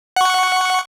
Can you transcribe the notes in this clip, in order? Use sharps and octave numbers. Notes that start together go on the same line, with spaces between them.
F#5 C#6